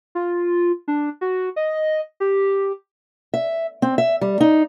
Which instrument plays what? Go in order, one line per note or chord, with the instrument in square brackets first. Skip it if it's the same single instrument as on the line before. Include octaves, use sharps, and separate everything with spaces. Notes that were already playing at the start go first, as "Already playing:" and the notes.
[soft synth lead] F4
D4
F#4
D#5
G4
[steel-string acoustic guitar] E5
C4
E5
G3
D#4